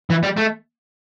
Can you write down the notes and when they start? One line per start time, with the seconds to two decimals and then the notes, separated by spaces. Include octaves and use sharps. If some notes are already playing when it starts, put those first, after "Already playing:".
0.10 E3
0.23 G3
0.37 A3